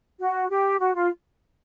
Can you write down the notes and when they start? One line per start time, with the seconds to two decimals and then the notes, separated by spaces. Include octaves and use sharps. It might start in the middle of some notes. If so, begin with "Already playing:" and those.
0.20 F#4
0.50 G4
0.80 F#4
0.95 F4